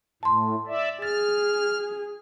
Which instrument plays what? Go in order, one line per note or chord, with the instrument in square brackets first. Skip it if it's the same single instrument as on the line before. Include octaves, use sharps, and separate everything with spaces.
[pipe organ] A2 [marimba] A5 C6
[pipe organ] D5 E5
[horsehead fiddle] G#4 [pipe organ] F6 [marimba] A6